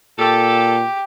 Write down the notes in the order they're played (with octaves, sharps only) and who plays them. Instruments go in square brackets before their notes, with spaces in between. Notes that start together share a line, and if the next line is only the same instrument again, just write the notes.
[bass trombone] A#2 [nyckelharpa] G4 [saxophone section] A4